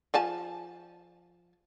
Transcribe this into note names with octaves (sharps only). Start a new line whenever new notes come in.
F3 G#5 A5